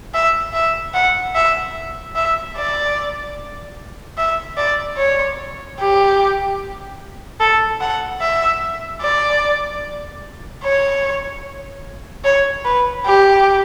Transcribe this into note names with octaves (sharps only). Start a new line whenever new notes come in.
E5
E5
F#5
E5
E5
D5
E5
D5
C#5
G4
A4
F#5
E5
D5
C#5
C#5
B4
G4